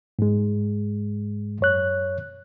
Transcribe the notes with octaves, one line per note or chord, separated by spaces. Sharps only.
G#2 G#3
F#2 C#5 F#6